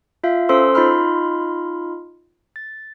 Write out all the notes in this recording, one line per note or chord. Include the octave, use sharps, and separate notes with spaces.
F4 E5 F5
C#4 A4 C5 C6 E6
D#4 F4 D#5 B5 C6 F6
A6